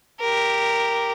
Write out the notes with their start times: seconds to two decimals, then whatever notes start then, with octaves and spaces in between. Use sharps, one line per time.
0.20 G4 A#4